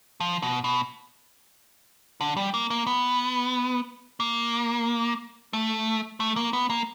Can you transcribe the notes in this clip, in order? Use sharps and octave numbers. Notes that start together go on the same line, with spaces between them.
F3
B2
B2
D3
G3
A#3
A#3
B3
A#3
A3
A3
A#3
B3
A#3